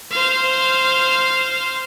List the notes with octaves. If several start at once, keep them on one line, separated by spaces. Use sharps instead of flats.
C5 F5